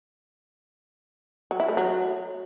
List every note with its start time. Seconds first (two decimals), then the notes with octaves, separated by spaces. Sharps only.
1.51 F#3
1.60 E4
1.68 A3
1.77 F#3